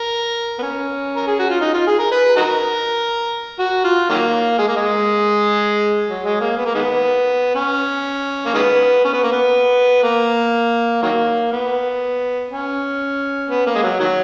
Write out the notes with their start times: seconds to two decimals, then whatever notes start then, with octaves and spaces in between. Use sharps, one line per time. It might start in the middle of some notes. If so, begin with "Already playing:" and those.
Already playing: A#4
0.59 B3
0.62 C#4
1.16 A#4
1.27 G#4
1.39 F#4
1.50 F4
1.61 D#4
1.74 F4
1.87 G#4
1.99 A#4
2.12 B4
2.36 D#4 F#4 A#4
3.59 F#4
3.84 F4
4.10 D#3 F#3 A#3
4.59 G#3
4.68 A#3
4.76 G#3
6.07 F#3
6.23 G#3
6.41 A#3
6.57 B3
6.65 A#3
6.74 D#3 G#3 B3
7.55 C#4
8.46 A#3
8.54 D#3 G#3 B3
9.05 C#4
9.13 B3
9.23 A#3
9.32 B3
10.04 A#3
11.02 D#3 F#3 A#3
11.52 B3
12.50 C#4
13.49 B3
13.67 A#3
13.75 G#3
13.83 F#3
14.00 D#3 F#3